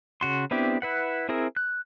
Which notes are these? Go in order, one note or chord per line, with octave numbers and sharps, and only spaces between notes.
C#3 F#4 C6
B3 C4 D4 E4 G4
E4 B4 F#5
C4 E4 G#4 A#4
F#6